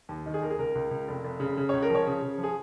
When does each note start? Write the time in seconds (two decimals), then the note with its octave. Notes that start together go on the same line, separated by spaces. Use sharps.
0.09 D#2
0.26 D#3
0.34 G#4
0.42 D#2 A#4
0.51 G#4
0.59 C#2 A#4
0.75 C#2
0.91 C#2
1.08 F1
1.24 F1
1.40 C#3
1.57 C#3
1.69 C#2 C#5
1.82 A#4
1.90 F3 C#5
2.07 C#3
2.22 C#3
2.38 F3
2.43 G#4